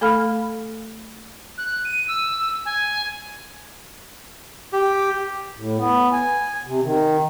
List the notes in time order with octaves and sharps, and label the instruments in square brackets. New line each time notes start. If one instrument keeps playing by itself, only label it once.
[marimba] A3 A4 F5 B5 F6
[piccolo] F#6
D#7
E6
G#5
[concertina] G4
[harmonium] A2
B3
G#5
C3
D#3